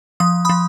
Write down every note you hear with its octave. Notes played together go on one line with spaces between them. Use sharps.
F3 D#6
F3 B5 D#6